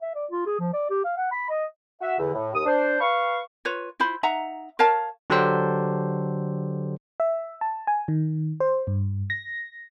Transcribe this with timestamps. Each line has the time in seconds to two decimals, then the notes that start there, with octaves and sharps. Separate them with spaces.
0.02 E5
0.15 D5
0.31 F4
0.46 G#4
0.59 F3
0.73 D5
0.90 G4
1.04 F5
1.17 F#5
1.32 B5
1.50 D#5
2.01 F#4 E5
2.19 E2 D3
2.34 A2
2.53 D#2 D#6
2.65 D4 C5
3.01 B4 F5 C#6
3.65 F4 B4 C#5
4.00 E4 F4 C5 B5
4.23 D#4 E5 F#5 A#5
4.79 A#4 C#5 F5 A5
5.30 D3 F#3 D4 G4 A4 C5
7.20 E5
7.61 A5
7.87 G#5
8.08 D#3
8.60 C5
8.87 G2
9.30 A#6